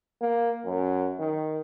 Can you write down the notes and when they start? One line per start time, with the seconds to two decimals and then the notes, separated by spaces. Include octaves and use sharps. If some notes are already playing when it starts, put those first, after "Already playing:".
0.21 A#3
0.65 F#2
1.19 D#3